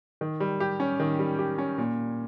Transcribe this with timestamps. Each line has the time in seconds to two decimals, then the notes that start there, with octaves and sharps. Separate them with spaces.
0.21 D#3
0.40 G3
0.60 G4
0.80 C#4
1.00 D#3
1.19 G3
1.39 G4
1.58 C#4
1.78 A#2